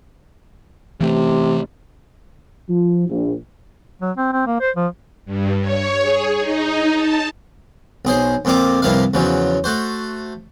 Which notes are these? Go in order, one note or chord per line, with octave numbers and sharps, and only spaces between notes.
C3 E3 A3
F3
A#1
F#3
C4
C4
A#3
C5
F3
G2
C#5
G#4
D#4
A5
B1 G#4 C5
F2 A#2 C4 F4 D6
C2 G2 F3 A#3 E4 F5
E2 C#3 F3 F#3
A3 F#4 C5